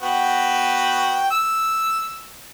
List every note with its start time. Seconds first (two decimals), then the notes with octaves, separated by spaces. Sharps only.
0.01 B3 F#4 G5
1.31 E6